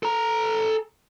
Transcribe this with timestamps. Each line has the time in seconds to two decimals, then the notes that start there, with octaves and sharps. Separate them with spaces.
0.03 A4 A#5